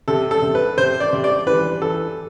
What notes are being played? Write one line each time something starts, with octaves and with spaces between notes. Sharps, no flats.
C3 A4
A4
C3
B4
C3 C5
D5
C3
D5
E3 B4
E3 A4